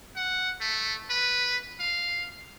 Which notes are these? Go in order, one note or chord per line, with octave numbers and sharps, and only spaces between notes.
F#5
A3
B4
F5